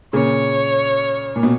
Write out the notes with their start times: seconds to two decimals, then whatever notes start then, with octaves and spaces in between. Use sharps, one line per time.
0.13 A#2 C#3 C#5
1.36 A#2
1.43 B2